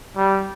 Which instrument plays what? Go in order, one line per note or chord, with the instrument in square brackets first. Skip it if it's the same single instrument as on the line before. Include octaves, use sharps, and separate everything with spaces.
[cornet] G3